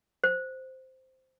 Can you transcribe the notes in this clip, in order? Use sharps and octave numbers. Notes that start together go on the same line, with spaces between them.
C5